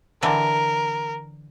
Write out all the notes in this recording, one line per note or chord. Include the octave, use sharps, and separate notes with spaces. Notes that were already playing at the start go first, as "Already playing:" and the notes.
D3 E3 A#4